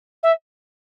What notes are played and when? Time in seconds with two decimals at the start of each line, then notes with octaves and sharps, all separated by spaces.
0.23 E5